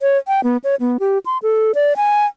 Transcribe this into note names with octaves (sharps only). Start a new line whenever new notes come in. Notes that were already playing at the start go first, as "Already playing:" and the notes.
C#5
G5
B3
C#5
B3
G4
C6
A4
D5
G#5